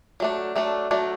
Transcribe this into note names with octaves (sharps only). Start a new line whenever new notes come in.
F#3 A3 D4
F#3 A3 D4
F#3 A3 D4